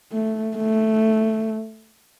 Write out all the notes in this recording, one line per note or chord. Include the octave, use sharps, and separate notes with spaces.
A3
A3